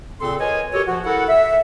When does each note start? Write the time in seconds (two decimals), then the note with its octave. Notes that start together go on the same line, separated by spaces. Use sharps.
0.20 A#2 C#3 C4 A4 C6
0.39 A#4 B4 C#5 D#5 G#5
0.72 F#4 G4 A4 A#4 C#5
0.87 F3 F#4
1.04 E4 A4 A#4 F#5
1.28 E5